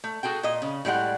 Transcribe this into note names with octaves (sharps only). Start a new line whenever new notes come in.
A3
F#4 G#4 A4 G5
A#2 D#5
C#3
A2 G3 G#3 F#5